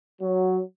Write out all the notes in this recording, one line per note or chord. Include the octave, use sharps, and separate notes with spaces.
F#3